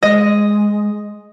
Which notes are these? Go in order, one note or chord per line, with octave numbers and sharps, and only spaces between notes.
G#3 D#5